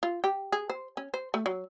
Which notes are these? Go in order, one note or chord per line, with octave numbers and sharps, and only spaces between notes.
F4
G4
G#4
C5
C#4
C5
A3
F#3